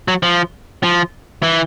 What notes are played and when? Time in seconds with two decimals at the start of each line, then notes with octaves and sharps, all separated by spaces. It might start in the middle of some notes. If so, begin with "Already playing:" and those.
0.08 F#3
0.23 F3
0.83 F3
1.43 E3